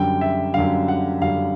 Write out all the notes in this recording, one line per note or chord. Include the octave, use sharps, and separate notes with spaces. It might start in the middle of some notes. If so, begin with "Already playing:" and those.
Already playing: F#2 D3 G3 G5
E5
F#2 D3 G3 F5
F#5
F#2 D3 G3 F5